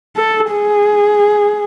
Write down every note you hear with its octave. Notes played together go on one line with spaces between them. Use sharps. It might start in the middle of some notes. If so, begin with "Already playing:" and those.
A4
G#4